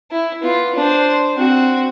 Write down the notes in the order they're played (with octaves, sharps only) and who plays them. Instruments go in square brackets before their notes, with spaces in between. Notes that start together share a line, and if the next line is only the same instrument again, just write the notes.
[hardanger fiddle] E4
B3 F4
D4 C5
C4 F#4